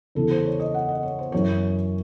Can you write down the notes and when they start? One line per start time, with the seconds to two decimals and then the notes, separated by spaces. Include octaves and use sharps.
0.15 E2 C#3 E3 A4
0.31 C5
0.45 C#5
0.60 D#5
0.74 F#5
0.88 D#5
1.03 C#5
1.19 C5
1.32 F#2 E3 C#5